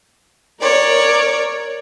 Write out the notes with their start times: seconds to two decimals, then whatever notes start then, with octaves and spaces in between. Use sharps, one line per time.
0.60 A#4 C#5 D5